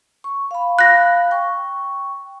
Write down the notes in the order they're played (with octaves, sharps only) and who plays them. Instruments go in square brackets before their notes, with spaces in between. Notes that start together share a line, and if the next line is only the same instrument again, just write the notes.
[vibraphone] C#6
F5 B5
[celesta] F#6 A#6
[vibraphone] G5 C#6